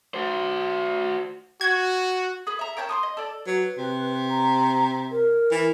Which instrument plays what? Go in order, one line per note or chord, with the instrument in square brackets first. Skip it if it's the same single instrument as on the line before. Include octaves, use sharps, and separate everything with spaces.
[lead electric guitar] F#4 C5
[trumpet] F#4 [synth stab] G#6
[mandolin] G#4 B4
E5 A#5
A#4 C#5 G5 A5
C6 C#6 D#6
D#5
A4 D5
[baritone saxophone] F#3 [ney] B4
[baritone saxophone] C3
[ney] A#5
A#4
[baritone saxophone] E3